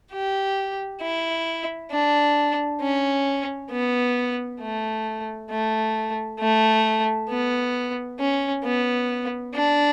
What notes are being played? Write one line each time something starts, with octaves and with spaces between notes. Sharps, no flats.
G4
E4
D4
C#4
B3
A3
A3
A3
B3
C#4
B3
D4